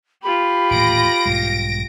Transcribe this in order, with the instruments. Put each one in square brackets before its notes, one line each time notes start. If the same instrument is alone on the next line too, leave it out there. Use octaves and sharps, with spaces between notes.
[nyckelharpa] F4 G4 [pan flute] B5
[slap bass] D#1 A2 E3 [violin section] A#6 D7
[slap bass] B1 G#2 G3